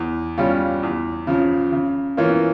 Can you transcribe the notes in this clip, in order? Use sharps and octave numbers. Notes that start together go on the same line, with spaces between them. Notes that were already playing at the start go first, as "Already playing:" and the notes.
Already playing: E2
C#3 G3 C#4 F4
E2
C#3 F3
C#3
E3 A#3 C#4 F4